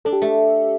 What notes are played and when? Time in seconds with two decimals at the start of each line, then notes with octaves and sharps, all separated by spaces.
0.05 D4 A4
0.13 G4
0.22 A3 A4